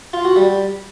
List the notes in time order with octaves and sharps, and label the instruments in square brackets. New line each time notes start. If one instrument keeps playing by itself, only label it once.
[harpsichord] F4
F#4
G3